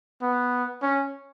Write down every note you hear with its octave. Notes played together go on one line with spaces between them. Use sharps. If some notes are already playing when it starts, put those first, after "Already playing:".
B3
C#4